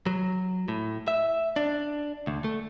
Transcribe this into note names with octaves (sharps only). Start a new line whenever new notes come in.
F#3
A2
E5
D4
D2
A3